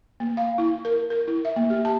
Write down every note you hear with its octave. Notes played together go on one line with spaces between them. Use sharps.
A#3
F5
E4
A#4
A#4
E4
E5
A#3
G4
A5